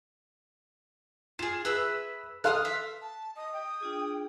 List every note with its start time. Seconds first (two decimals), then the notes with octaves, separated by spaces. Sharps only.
1.39 F4 G#4 E7
1.65 G#4 B4 E5 E6
2.44 A4 F5 C6 D#6 F6 F#6
2.65 E5
3.01 A5
3.36 D#5 D#6
3.53 G5
3.81 D4 F4 G#4